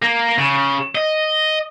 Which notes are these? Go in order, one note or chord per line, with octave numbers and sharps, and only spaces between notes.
A#3
C#3
D#5